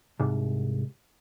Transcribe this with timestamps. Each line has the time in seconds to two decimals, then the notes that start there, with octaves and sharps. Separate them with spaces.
0.20 C2 G#2